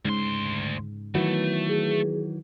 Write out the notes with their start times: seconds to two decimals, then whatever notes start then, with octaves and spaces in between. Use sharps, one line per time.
0.05 D2 G#2 C#3 C6
1.15 D#3 E3 F#3 A3 B3
1.69 G#4